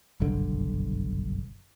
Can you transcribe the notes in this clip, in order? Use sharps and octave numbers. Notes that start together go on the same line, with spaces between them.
F#1 B1 G2 D3